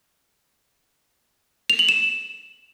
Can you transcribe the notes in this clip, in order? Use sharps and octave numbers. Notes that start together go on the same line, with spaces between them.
F7
F#7
E7